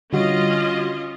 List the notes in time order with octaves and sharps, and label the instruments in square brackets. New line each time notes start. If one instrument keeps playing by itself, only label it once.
[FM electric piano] D3 G3 F#4 [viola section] C#4 F4 D#5